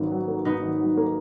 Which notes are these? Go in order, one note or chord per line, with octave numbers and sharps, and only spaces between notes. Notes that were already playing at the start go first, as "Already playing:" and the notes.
Already playing: G#1 G#2 F#3 A#3 B3 C#4 D#4
F#3
A#3
G#2 B3 D#4
G#1
F#3
A#3